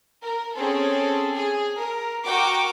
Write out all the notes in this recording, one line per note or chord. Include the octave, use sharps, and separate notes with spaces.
A#4
C4 C#4 G#4 A4
G#4
A#4
F#4 A#4 G5 C#6 D6